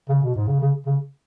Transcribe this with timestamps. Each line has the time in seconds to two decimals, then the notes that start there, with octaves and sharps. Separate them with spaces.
0.09 C#3
0.23 B2
0.35 G#2
0.47 C#3
0.60 C#3
0.86 C#3